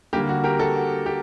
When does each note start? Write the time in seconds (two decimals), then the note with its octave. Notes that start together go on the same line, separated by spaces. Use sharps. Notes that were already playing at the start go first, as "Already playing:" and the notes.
0.13 D3 G3 A#3 G4
0.29 F#4
0.44 G4 A#4
0.59 F#4 A4
0.76 F#4
1.06 G4